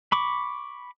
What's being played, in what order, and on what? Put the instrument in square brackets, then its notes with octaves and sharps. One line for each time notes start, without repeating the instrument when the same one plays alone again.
[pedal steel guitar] B5 C#6 D6